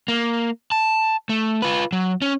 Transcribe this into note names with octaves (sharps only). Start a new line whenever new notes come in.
A#3
A5
A3
F4 B4
F#3
C#4